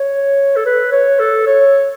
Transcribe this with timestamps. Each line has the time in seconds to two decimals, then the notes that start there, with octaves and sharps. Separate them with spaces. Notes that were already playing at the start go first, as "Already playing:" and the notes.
Already playing: C#5
0.56 A4
0.65 B4
0.92 C#5
1.19 A4
1.46 C#5